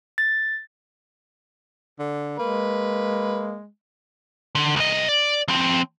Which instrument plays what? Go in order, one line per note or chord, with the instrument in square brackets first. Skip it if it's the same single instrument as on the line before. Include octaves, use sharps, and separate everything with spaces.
[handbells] A6
[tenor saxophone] D3
[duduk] G#3 [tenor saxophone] A#3 [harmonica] B4
[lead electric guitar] D3
C2 D#5
D5
F3 C4